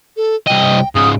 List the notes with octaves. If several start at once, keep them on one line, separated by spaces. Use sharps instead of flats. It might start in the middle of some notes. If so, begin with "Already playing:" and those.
A4
C2 D#5 G5
G#2 C#3 D#6